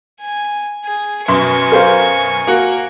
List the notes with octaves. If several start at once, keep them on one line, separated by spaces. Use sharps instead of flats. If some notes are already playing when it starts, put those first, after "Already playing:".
G#5
G#4
F#2 B2 G#5 C6 C#6
A#4 C5 F5
A#3 F#4